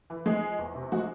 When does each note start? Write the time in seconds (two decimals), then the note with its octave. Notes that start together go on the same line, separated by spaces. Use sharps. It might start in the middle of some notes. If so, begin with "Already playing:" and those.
0.10 E3
0.26 G#3 G#4
0.43 F3
0.58 E2
0.75 C3
0.92 G#3 F#4